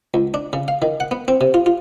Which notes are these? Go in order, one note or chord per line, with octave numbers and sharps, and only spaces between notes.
C#2
D4
C#3
F5
D#3
F#5
B3
C4
C3
F4
F4